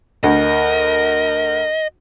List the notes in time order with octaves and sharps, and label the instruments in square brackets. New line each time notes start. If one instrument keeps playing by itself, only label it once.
[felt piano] D2 [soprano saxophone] A#4 [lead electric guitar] D#5